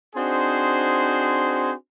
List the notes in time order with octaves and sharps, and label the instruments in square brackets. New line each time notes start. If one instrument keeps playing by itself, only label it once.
[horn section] C4 D4 D#4 F#4 G#4 C5